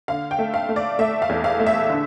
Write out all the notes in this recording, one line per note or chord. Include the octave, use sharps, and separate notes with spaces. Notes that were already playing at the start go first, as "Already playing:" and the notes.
D3 F5
G5
A3
F5
A3
D5
A3 E5
F5
E2
F5
A3
E5
D3